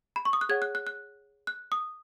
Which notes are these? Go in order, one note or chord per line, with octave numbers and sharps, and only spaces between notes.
B5
C#6
D#6
F#6
G#4 C#5 F#5 G#6
F#6
F#6
F#6
F#6
D#6